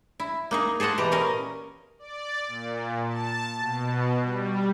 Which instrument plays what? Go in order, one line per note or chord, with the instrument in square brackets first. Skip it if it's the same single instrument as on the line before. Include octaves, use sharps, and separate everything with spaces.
[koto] E4
A#3 D#4 G#4
G#4 A4 C5 D#5 F#5
B2 E3 G4 A#5
A#2 C#4 A#4 D#5
[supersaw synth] D5
A#2
A5
B2
G3